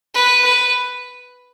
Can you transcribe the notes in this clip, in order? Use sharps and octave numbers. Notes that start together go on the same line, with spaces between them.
B4
B4